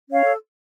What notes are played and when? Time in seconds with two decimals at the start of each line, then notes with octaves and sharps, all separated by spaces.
0.08 C#4 C#5 F5
0.24 A4